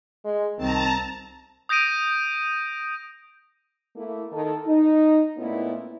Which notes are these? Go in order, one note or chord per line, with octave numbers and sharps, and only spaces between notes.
G#3
C2 D#3 C4 A5 A#5
D#6 G6 A#6 D7 D#7
A3 A#3 E4
D#3 A4
D#4
A#2 A3 B3 C#4 D#4 E4